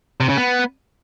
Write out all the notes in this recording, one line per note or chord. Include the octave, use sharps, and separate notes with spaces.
C3
C#3
B3